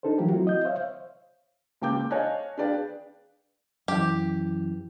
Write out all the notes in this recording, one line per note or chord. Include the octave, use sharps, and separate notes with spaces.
D4 D#4 A4 A#4 C5
E3 F#3 A3 F4 G4 A#4
F#3 C4 E4 F#4
D#5 G6
C5 C#5 E5 F5
C#2 A#3 G5 D6 G6
C#5 D#5 F5 G#5 A5 F#6
D4 G#4 B4 D5 F5 G5
F#2 E3 G4